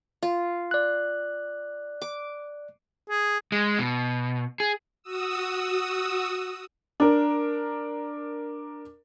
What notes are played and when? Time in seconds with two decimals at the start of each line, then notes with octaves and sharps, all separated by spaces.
0.23 F4
0.71 D5 F#6
2.02 D6
3.10 G#4
3.52 G#3
3.79 B2
4.60 G#4
5.03 F#4 D#6 E6
7.00 D4 A#4